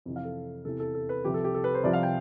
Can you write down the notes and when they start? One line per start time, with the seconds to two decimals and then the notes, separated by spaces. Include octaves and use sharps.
0.05 F2 C3 E3
0.16 F5
0.25 A4
0.65 E2 C3 E3 A4
0.80 A4
0.94 A4
1.09 B4
1.24 C2 C3 F3 G4
1.34 A4
1.44 G4
1.54 A4
1.64 B4
1.75 C5
1.83 C2 C3 F3 D5
1.93 F5
2.03 G5